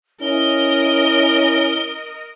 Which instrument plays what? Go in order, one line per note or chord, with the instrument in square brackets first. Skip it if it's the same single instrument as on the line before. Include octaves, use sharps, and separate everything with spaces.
[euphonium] C#4 [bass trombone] E4 [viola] A#4 D#5 [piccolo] G7